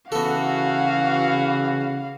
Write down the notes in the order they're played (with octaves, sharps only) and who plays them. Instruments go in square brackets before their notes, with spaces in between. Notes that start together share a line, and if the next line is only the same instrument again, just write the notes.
[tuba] C#3 [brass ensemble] E3 F#4 [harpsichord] B3 A4 [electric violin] F5